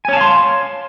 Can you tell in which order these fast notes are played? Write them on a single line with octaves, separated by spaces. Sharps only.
G#5 C#5 A5 F5 C6